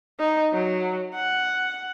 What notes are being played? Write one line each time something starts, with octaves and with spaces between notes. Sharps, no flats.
D#4
F#3
F#5